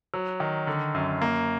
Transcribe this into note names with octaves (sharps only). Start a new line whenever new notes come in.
F#3
D#3
D3
F#2
A#3